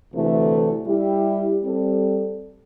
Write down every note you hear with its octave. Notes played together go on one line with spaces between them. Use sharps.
D2 C3 E3 A3
G3 E4 G4
G3 C4 A4